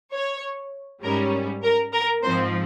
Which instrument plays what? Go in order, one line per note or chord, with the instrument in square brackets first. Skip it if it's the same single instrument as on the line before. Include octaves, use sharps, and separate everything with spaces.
[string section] C#5
G#2 G3 C#4 A#4
A#4
A#4
G#2 F3 C4 C5